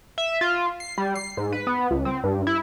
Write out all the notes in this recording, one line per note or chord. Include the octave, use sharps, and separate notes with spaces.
E5
F4
C7
G3
C7
G#2
B4
B3
C#2
C4
G2
E4